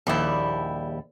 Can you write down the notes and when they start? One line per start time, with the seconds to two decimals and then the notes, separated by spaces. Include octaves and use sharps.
0.07 A#1 D#2 G3 E4